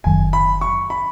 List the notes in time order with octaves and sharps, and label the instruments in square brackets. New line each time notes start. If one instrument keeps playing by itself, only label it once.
[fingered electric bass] F#1 F#2 D#3 F#3 [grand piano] G#5
[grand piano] B5
C#6
B5